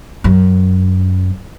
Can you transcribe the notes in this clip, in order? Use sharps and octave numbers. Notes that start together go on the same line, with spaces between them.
F#2